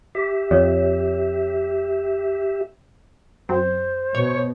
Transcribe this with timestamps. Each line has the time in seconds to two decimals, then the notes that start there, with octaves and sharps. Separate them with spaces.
0.15 G4 E5
0.51 F2 C#5
3.49 F#2 C4 C5
4.15 B2 C#5 G#6